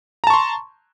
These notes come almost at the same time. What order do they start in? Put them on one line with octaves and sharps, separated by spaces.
A#5 A5 C#6 C6